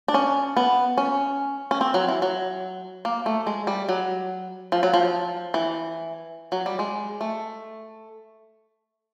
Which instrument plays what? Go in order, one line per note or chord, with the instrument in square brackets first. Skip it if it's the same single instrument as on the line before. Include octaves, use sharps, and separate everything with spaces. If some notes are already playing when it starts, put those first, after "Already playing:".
[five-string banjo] D4
C#4
B3
C#4
C#4
C4
F#3
E3
F#3
A#3
A3
G#3
G3
F#3
F3
F#3
F3
E3
F#3
G3
G#3
A3